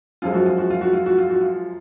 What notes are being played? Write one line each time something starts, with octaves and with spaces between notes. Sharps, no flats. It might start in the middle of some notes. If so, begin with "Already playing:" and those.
F#2 F3 G#3 F4
F#4
F4
F#4
F4
F#4
F4
F#4
F4
F#4
F4